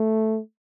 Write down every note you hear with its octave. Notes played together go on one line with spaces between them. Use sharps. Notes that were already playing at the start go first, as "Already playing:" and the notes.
Already playing: A3